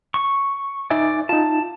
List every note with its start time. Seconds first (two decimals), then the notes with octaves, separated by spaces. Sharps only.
0.14 C#6
0.90 D#4 D5 E5 G#5
1.29 D#4 F4 A5